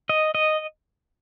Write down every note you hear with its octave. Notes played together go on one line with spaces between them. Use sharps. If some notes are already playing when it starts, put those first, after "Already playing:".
D#5
D#5